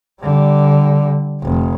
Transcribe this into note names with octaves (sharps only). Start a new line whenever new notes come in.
D3 G3
F1